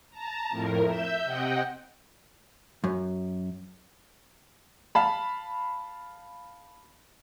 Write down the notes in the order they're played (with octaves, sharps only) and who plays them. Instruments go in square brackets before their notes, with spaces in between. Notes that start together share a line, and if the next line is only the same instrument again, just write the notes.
[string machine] A5 A#5
F2 A2 A#4
E5 E6 G6
C3 D#5 F#5 G5 G6
[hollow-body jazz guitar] F#2
[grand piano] F5 A5 B5